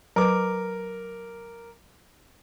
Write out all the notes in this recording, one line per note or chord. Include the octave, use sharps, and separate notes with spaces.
F#3 A#4 B4 D6